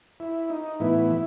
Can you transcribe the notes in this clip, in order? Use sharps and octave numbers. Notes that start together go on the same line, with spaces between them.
E4
D#4
A2 E3 B3 E4
E4